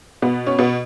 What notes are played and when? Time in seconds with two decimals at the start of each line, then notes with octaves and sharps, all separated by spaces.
0.22 B2 B3
0.46 C#4
0.58 B2 B3